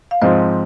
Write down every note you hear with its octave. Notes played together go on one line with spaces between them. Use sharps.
F5
G#2 F3 C4 C5 D#5